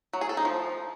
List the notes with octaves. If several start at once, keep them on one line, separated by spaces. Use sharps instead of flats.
F#3
G#4
A4
D#4
F3